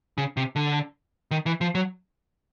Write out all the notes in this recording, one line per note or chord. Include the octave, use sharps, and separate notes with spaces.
C#3
C3
D3
D#3
E3
F3
F#3